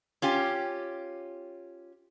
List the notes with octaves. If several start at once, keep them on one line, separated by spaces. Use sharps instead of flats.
C#4 F4 G4